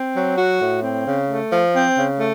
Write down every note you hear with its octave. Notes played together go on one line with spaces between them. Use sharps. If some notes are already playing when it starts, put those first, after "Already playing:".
Already playing: C4
F#3
F#4
A2
C4
C#3
A3
F3
C4
C#3
A3